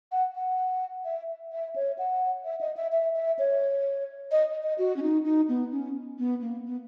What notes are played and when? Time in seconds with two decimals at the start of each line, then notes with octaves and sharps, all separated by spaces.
0.12 F#5
0.35 F#5
1.05 E5
1.52 E5
1.76 C#5
1.98 F#5
2.45 E5
2.61 D#5
2.77 E5
2.92 E5
3.16 E5
3.39 C#5
4.32 D#5
4.63 D#5
4.78 F#4
4.96 C#4
5.02 D#4
5.25 D#4
5.49 B3
5.72 C#4
6.19 B3
6.41 A#3
6.65 B3